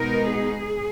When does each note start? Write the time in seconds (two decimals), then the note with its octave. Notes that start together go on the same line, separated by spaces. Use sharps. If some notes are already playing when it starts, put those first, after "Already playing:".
Already playing: B2 G#3 B3 D#4 A#4
0.33 G#4